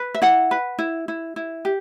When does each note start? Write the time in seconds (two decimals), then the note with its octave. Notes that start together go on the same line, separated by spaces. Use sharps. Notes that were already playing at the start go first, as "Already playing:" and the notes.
Already playing: B4
0.14 E5
0.22 E4 F#5
0.51 B4
0.79 E4
1.08 E4
1.36 E4
1.65 G4